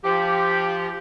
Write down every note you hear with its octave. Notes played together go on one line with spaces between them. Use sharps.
F3 G4